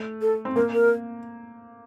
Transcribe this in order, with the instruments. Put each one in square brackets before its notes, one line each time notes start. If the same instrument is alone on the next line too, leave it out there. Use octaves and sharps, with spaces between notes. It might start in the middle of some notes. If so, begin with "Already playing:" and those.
Already playing: [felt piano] A3
[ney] A4
[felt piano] C4
[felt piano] A#3 [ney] A#4
[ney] A#4